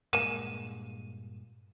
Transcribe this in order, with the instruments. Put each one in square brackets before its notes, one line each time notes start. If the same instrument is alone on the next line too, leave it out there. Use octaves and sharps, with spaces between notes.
[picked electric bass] G2 A#2 G#3 [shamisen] A#3 G#5 [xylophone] D#7 E7